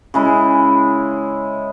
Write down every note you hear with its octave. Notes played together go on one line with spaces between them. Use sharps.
C#3 G#3 E4